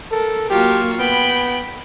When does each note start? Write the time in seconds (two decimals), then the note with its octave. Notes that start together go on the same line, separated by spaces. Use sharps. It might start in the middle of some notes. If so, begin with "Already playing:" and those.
0.12 A4 A#4
0.50 F#3 A#3 F4 G4 C#6
0.99 B3 G5 B5